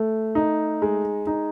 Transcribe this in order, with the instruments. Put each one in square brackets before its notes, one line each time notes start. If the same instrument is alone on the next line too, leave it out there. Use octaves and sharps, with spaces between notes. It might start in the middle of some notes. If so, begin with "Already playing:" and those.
Already playing: [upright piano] A3
D#4
G#3
D#4